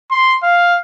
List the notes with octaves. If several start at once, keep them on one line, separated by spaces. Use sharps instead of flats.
C6
F5